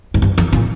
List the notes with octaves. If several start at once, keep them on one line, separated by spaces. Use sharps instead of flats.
G#2
G2
F2
A#2